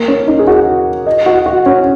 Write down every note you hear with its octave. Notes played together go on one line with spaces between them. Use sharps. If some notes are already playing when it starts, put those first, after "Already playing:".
Already playing: A#3
C#4
D#4
G#4
F#4
D#5
F#4
F#4
C#4